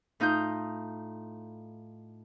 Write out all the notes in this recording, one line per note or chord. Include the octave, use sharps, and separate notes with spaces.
A2 D#4 F4 D#6 G6